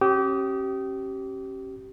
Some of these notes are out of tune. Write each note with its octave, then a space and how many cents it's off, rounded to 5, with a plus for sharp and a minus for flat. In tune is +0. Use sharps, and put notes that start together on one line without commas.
C#4 -35 G4 -30 D#6 +0